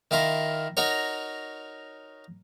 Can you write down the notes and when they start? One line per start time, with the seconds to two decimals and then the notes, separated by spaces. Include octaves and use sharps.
0.11 D#3 E4 F4 A#4
0.77 D#4 F#4 A#4 C#5